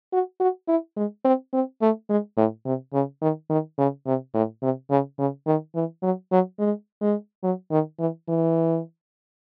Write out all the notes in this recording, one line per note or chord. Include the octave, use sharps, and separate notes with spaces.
F#4
F#4
E4
G#3
C4
C4
A3
G#3
A2
C3
C#3
D#3
D#3
C#3
C3
A2
C3
C#3
C#3
D#3
E3
F#3
F#3
G#3
G#3
F#3
D#3
E3
E3